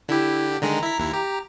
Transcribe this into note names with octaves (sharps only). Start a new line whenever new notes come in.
D3 E4 G4
D3 D#3 G#3 A#5
E4 B6
D#2 E4
G4